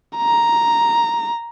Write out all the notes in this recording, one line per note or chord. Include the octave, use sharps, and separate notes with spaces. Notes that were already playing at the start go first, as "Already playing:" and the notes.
A#5